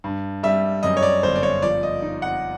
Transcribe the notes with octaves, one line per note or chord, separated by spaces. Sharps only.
G2
G3 E5
F#2 D#5
C#5
D5
G1 C5
D5
C#5
F3 D5
D#5
D#4
F#5